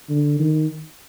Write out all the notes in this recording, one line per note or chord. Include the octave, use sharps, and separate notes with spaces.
D3
D#3